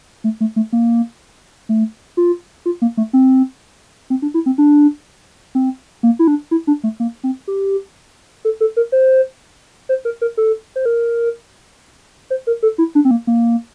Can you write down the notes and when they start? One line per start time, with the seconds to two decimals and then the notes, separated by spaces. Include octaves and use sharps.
0.24 A3
0.41 A3
0.56 A3
0.73 A#3
1.69 A3
2.17 F4
2.66 F4
2.82 A#3
2.97 A3
3.13 C4
4.10 C4
4.22 D4
4.34 E4
4.46 C4
4.58 D4
5.55 C4
6.03 A#3
6.19 E4
6.27 D4
6.51 E4
6.67 D4
6.84 A3
7.00 A#3
7.24 C4
7.48 G4
8.45 A4
8.61 A4
8.77 A#4
8.92 C5
9.89 C5
10.05 A#4
10.21 A#4
10.37 A4
10.76 C5
10.86 A#4
12.30 C5
12.47 A#4
12.63 A4
12.78 E4
12.95 D4
13.05 C4
13.11 A#3
13.27 A#3